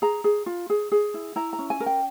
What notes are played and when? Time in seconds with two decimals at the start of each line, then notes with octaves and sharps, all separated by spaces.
0.02 G#4 A#5
0.24 G#4
0.46 F4
0.70 G#4
0.92 G#4
1.14 E4
1.36 E4 A#5
1.53 A#5
1.59 C#4
1.70 G#5
1.80 A#4
1.86 G5